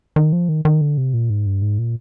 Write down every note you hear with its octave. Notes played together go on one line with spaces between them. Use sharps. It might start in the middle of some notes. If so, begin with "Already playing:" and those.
D#3
F3
D#3
D#3
D3
C3
A#2
G#2
G2
G#2
A#2